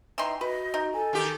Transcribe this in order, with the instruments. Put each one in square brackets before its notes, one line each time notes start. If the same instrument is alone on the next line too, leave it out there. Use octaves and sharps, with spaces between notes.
[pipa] E3 D#4 C6 [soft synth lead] G5
[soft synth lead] F#4 [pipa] B4 [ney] D#5
[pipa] D#4
[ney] A4 [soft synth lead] G#5
[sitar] D#3 G4